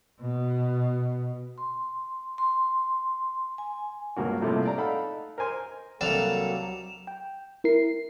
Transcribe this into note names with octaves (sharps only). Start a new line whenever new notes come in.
B2
C6
C6
G#5
C#2 G2 A#3 F#4
A2 C3 F3 G3 A3 A#3
D5 A#5
D#4 A4 F5 F#5 B5
A#4 C5 G#5 C6
C2 F#3 G3 A#3 D4 A4 E7 F7
G5
E4 A#4 C7